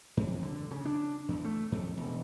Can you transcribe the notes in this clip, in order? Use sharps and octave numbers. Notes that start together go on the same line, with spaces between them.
F2
D3
C#3
D4
E2
A3
F2
E1